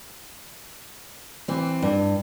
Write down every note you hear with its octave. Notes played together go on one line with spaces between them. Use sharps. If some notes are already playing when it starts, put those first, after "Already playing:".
E3 C4
G2